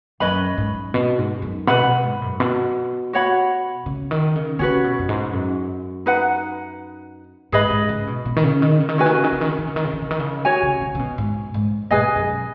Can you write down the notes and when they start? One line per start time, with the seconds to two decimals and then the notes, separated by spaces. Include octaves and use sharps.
0.20 F#2 C#4 B4 D#5 B5
0.58 G#2
0.94 B2
1.18 G#2
1.42 F#2
1.67 B2 B4 F#5 B5
1.85 B2
2.04 G#2
2.22 F#2
2.40 B2
3.13 F#4 C#5 F#5 B5
3.86 C#3
4.11 D#3
4.35 C#3
4.59 C#3 C#4 F#4 B4
4.84 B2
4.99 F#2
5.09 G#2
5.33 F#2
6.06 D#4 B4 F#5
7.52 G#2 G#4 B4 D#5 B5
7.71 G#2
7.89 C#3
8.07 B2
8.25 B2
8.36 D#3
8.44 C#3
8.62 D#3
8.80 C#3
8.89 D#3
8.98 C#3 C#4 F#4 B4 G#5
9.06 D#3
9.15 C#3
9.24 D#3
9.32 C#3
9.41 D#3
9.50 C#3
9.58 D#3
9.67 C#3
9.76 D#3
9.85 C#3
9.93 D#3
10.02 C#3
10.11 D#3
10.19 C#3
10.45 F#4 C#5 G#5
10.63 C#3
10.81 C#3
10.95 C#3
10.99 B2
11.18 G#2
11.54 G#2
11.91 B2 G#4 B4 D#5 G#5
12.16 F#2